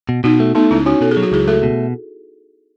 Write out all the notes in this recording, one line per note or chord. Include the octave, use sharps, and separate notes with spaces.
B2
B2 D#4 F#4
A3
A3 B3 D#4
C#2 C#4 E4
C#4 D#4 F#4
B2 A4
G#4
F#3
F#4
C#2 E4 G#4
A3 F#4 A4
B2